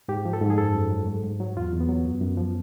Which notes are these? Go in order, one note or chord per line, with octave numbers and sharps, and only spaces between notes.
G#2 G4
F3
A4
G#2
G#4
F#2 A4
F#2
F#3
G#2
G#2
F#3
E2 F4
E2
B3
F#3
F#2
F#2
F3